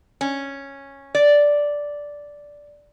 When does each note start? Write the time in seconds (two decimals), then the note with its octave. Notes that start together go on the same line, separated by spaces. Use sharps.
0.21 C#4
1.15 D5